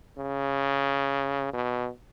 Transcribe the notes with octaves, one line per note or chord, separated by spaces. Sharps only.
C#3
B2